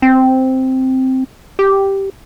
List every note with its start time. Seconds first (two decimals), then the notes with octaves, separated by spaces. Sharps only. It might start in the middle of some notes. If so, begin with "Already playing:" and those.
0.02 C4
1.59 G4